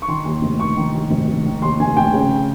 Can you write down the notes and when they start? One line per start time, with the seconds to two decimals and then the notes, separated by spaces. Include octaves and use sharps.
0.02 C#6
0.08 D#3 C6
0.25 D#2
0.42 F1
0.60 F1 C#6
0.77 D#3
0.94 D#2
1.11 F1
1.28 F1
1.45 D#3
1.62 D#2 C6
1.80 F1 G#5
1.96 F1 G5
2.13 C#3